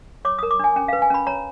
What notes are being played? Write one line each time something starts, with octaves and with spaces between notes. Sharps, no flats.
C#5 D6
A#4 D#6
D6
D4 G#5
C#4 G5
B4 F5
G#5
C#4 B5
C#5 A#5